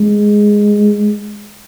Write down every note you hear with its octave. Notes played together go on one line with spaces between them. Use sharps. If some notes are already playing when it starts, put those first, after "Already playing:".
Already playing: G#3